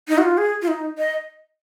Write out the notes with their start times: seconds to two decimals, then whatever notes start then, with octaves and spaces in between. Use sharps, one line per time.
0.09 D#4
0.18 F#4
0.23 F4
0.38 G#4
0.62 F4
0.68 D#4
0.98 D#5